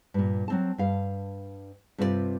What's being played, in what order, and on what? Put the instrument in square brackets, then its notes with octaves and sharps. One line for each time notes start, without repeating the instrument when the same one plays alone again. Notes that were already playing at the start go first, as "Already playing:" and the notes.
[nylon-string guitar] G2 A#2
F#3 C4 A5
G2 F5
G2 C3 C4 F4 A4 D5